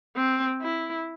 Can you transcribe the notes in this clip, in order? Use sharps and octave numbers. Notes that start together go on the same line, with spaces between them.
C4
E4